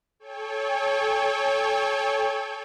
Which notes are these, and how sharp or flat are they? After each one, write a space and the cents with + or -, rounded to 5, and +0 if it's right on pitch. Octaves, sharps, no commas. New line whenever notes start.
A4 -30 C#5 +0 G5 +35